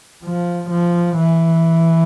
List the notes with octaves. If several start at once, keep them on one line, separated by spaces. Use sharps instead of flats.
F3
F3
E3